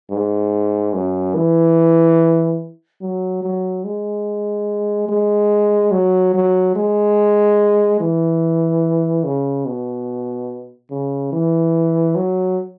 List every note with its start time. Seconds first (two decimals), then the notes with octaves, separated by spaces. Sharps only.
0.11 G#2
0.94 F#2
1.35 E3
3.01 F#3
3.43 F#3
3.85 G#3
5.09 G#3
5.92 F#3
6.34 F#3
6.76 G#3
8.00 E3
9.24 C#3
9.66 B2
10.91 C#3
11.32 E3
12.15 F#3